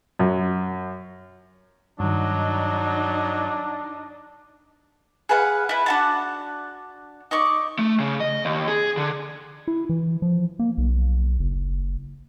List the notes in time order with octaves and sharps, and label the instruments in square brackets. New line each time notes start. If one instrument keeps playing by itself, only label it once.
[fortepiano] F#2
[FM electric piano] G2 D#3 [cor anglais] F#3 [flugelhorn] D4 [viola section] D#4 D#5
[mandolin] G#4 B4 F5 F#5
E4 B4
D4 F#4 A5
D#4 D5 C#6
[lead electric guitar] A3
C#3
D#5
D#2
G#4
D3
[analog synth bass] E4
E3
F3
A#3
B1
F#1